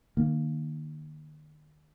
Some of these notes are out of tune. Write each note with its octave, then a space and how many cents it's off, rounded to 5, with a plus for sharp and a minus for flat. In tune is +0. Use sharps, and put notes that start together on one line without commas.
D#3 -40 A#3 +0